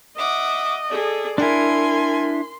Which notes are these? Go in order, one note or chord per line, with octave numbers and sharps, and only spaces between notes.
D#5 E5 F#5 D6
G#4 A4 D5
D4 E4 A#4 G#5 C6